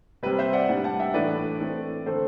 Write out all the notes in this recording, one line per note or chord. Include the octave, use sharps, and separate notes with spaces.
C3 G3 C4 B4
C5 E5
D5 F#5
A2 G3 D4
F#5 A5
E5 G5
A2 E3 A3 D4 B4 D5
E3 A3 C4
D3 A3 C4 A4 C5